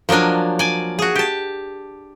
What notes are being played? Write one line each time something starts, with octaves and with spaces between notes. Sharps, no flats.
F3 F#3 A#3 D4 G#5
D5 G#5
F#4 G#4
G4 A5